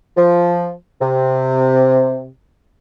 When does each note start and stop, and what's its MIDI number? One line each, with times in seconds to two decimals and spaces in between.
0.17 0.70 53
1.00 2.26 48